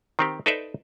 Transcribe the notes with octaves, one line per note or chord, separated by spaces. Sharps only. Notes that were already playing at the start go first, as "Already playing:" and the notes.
D#3 C4 G4
D#4 A4 B4 C5 D5 E5